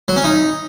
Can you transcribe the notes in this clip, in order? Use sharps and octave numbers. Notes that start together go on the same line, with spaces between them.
F#3
C#4
D#4